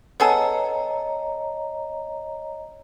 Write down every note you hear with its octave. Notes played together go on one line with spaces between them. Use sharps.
B3 G#4 A4 C#5 D#5 A#5